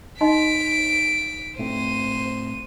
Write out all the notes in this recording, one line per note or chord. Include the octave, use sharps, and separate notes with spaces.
D#4 D#5 C6 B6 D7
A2 A3 C4 C5 D#7